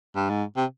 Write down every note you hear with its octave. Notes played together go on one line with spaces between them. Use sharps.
G2
G#2
C3